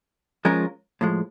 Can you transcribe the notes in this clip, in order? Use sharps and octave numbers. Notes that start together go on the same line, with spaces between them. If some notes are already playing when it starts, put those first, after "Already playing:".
F3 G#3 C#4 F4 A#4
A2 F3 G#3